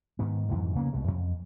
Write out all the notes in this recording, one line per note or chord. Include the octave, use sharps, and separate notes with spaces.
G#2 D#3 B3
F2 G#2 E3 F#3
C#3 A#3 B3
C2 B2 G#3
F2